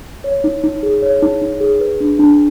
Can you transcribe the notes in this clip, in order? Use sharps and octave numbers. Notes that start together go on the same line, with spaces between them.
C#5
D#4
D#4
G#4
C#5
D#4
D#4
G#4
B4
D4
D4